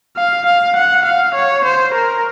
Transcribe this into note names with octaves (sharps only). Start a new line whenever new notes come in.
F5
F5
F#5
F5
C#5
C5
A#4